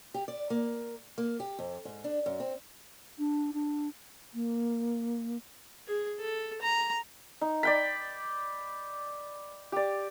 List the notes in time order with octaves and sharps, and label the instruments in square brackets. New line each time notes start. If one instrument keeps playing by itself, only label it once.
[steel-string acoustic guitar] G4
D5
A#3
A#3
G4
F2
G#2
D4
F#2
C4
[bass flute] D4
D4
A#3
[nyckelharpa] G#4
A4
A#5
[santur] D#4
D5 G5 B5
G4 D5